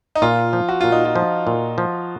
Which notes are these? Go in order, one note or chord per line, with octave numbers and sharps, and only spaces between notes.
D#4
A#2 F4
F3
F#4
A#2 F4
D#4
F4
F3
A#2
F3